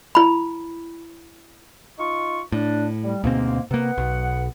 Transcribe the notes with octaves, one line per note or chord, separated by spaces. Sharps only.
E4 B5
D#4 F4 C#6
A2 D4
G3
D2 G#2 B2 A#3 C4
C3 A#3 B3 F#5
B1